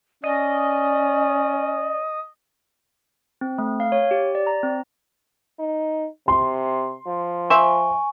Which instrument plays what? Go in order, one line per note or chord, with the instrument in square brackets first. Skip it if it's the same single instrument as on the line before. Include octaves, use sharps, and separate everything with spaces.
[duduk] C#4 [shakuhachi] D5 [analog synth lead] D#5
[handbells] C4
A3
F5
C#5
G4
D5
A#5
C4
[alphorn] D#4
[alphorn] C3 [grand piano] C6
[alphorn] F3
[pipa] C5 E5 [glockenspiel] G#5 C#6